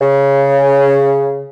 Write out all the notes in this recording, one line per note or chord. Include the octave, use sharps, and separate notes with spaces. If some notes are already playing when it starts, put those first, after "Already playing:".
C#3